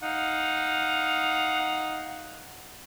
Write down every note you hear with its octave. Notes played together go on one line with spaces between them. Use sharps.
D#4 F5 F#5